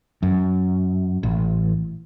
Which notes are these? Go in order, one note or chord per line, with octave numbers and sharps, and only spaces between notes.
F#2
A1